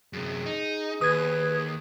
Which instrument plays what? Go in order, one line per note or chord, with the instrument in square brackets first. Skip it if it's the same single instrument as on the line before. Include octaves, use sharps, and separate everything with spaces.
[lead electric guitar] F#2 C3 [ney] G#4
[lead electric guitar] D#4
[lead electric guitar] D#2 [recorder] B4 [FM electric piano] D#6 G#6